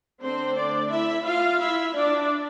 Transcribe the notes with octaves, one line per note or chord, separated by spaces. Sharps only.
D3 A3 C4 D4 C5
D4 D5
E4 E5
F4 F5
E4 E5
D4 D5